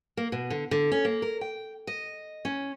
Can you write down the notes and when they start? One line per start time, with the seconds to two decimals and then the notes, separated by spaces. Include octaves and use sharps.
0.17 A#3
0.32 B2
0.50 D3
0.71 D3
0.92 C#4
1.05 A#3
1.22 A#4
1.41 G5
1.87 D#5
2.45 C#4